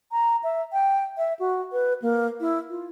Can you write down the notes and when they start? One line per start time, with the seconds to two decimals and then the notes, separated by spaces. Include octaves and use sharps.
0.12 A#5
0.43 E5
0.73 G5
1.18 E5
1.39 F#4
1.73 B4
2.02 A#3
2.40 E4
2.70 F4